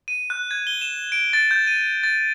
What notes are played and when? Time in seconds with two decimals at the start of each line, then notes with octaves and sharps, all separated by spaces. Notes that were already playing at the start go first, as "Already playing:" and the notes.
0.08 D#7
0.30 F#6
0.51 G#6
0.67 G7
0.81 E7
1.12 D7
1.33 A6
1.51 G6
1.67 D#7
2.03 A6